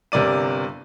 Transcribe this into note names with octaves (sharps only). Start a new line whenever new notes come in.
G1 C3 A#4 D5 D#7